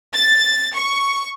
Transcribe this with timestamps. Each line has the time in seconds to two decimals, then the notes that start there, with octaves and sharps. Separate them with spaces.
0.14 A6
0.76 C#6